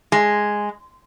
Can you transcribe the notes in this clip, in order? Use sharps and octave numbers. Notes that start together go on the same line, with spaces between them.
G#3